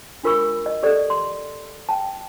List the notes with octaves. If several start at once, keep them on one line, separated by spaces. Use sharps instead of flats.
D4 F4 A#4 B5 C#6 E6
D#5
G4 A4 D5
C6
G5 A5